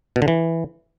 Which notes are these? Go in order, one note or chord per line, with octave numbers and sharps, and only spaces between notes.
B2
D3
E3